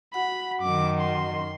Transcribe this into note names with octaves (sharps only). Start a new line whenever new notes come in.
F#4 F#5 B5
F#2 D#3 D6
C6